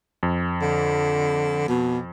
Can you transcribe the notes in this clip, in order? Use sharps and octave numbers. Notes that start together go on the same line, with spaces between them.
F2
D3
B2